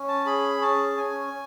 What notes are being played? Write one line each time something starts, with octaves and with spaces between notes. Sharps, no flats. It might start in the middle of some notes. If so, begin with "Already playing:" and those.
Already playing: C#4
A5
G#4 B5
C#4 A5
C#4 G#5